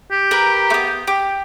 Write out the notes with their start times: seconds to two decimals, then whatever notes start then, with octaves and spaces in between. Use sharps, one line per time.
0.11 G4
0.31 A#4 B4
0.70 A3 B3
1.07 G4